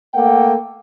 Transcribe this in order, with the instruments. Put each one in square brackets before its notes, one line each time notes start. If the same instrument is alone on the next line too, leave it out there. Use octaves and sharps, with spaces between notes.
[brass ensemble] A3 A#3 F#5 G5